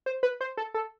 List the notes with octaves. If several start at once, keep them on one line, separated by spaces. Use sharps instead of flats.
C5
B4
C5
A4
A4